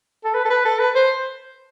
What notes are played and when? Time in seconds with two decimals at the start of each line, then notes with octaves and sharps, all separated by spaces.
0.25 A4
0.35 B4
0.45 A4
0.50 B4
0.65 A4
0.79 B4
0.96 C5